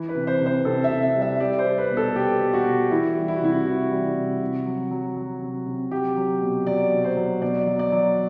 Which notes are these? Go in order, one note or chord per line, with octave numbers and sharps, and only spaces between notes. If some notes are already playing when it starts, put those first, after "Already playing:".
Already playing: E3
B4
C3
C5
C3
C5
C3 A4
E5
C3
E5
G3
E5
G3 D5
C5
G3
B4
B2
A4
B2 G4
B2
F#4
B2
E3 E4
G3
E4
F#4
C3 E4
E3 F#4
G3
C3
C3
F#3
F#3
F#3
C3
C3
F#3 G4
F#3
B2
F#3 D5
B2
C5
F#3
B2 D5
F#3
D5
F#3